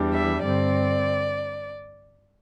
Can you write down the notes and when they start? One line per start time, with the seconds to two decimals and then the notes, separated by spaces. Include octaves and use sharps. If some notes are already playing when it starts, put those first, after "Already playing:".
Already playing: E2 E3 G3 D4
0.14 E5
0.43 G2 D3 C4 D5